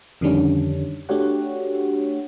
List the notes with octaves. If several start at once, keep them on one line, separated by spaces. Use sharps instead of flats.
F2 D3 D#3 G3 C#4 D4
A3 D4 F#4 G4 C#5 F#5